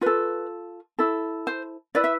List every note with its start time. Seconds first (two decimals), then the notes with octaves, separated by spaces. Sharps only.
0.01 F4 A4 B4
0.99 E4 A4
1.47 C5
1.95 E4 B4 D5
2.04 E5